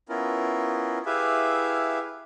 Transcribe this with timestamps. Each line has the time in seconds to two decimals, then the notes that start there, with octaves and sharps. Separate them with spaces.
0.09 B3 C#4 E4 F4 A#4
1.06 E4 G4 G#4 B4 E5 F5